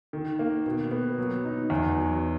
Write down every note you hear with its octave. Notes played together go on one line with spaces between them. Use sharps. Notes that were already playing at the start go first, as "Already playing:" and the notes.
D#3
A#3
B2
B3
F#3
D#4
E2
F#3